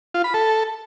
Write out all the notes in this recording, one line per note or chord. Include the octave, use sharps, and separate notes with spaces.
F4
B5
A4